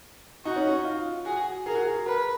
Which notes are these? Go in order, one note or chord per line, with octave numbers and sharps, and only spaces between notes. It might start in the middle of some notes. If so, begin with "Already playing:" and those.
D#4 F#4
C#4
D#4
F4
F#4 G#4
G#4 A#4
F#4
G#4
A#4 B4